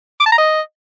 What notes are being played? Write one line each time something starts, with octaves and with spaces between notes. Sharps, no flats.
D6
A5
A#5
D#5